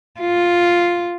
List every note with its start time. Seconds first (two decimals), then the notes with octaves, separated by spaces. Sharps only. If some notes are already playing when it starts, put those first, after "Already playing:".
0.20 F4